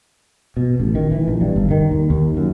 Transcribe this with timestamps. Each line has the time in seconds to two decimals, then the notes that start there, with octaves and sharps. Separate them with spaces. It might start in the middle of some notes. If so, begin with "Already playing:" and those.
0.57 B2
0.80 A1
0.95 D#3
1.12 E3
1.28 A#1
1.41 G2
1.56 G1
1.71 D#3
1.91 D#2
2.10 D#2
2.37 F#2